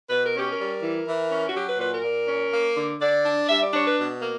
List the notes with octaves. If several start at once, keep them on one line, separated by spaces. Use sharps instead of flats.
B2 B4
A#4
C#4 G4
A#4
G3
E3
E3
C#4
F#4
F#3 G4
B4
A#2 B4
A#4
A#2
C#4
A#3
D3
D3 D5
D4
G3 E5
D5
D4 C#5
B4
B2
A#3